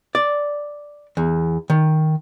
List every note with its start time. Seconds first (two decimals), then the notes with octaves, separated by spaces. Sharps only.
0.15 D5
1.17 E2
1.70 D#3